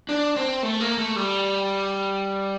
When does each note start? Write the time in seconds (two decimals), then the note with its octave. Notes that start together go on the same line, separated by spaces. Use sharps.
0.09 D4
0.36 C4
0.63 A3
0.80 A#3
0.98 A3
1.16 G3